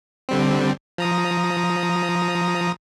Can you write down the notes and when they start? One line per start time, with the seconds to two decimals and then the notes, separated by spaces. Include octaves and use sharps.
0.29 D3 G3 C4
0.98 F3 A#5 D#6